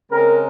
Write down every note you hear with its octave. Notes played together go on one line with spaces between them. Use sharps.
C#3 G#3 C4 A#4